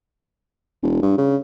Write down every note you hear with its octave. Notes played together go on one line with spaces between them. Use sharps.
E1
G2
C#3